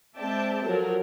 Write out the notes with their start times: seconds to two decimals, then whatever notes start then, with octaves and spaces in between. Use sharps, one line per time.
0.17 G#3 C4 D5 E5 G5 A5
0.66 F3 F#3 A4 A#4